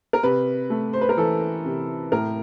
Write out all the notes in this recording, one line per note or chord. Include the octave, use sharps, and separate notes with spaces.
A#4
C3 B4
A3
C5
B4
A#4
E3 A4
C3
A2 A#4